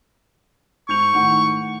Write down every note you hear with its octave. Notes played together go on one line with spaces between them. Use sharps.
G#2 C#6 G6 F7
A2 D#3 F#5